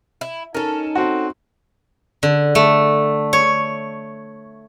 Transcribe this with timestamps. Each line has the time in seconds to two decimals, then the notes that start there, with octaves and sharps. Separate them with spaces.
0.21 E4
0.55 C#4 D#4 A4 A#4
0.96 C4 F#4
2.23 D3
2.55 A3
3.33 C#5